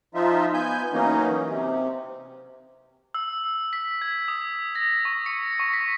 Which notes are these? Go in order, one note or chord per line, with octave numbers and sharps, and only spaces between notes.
F3 D#4 F4 E5
B3 G#5 G6
E3 F#3 A#3 C#4 D#4
C3
E6
B6
G#6
D#6
A#6
C#6
C#7
C#6
B6